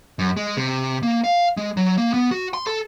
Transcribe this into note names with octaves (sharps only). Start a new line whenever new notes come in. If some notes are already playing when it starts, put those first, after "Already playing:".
F#2
G#3
C3
A#3
F5
G#3
F#3
A#3
B3
F#4
C6
A4